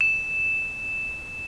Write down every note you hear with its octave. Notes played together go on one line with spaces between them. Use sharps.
E7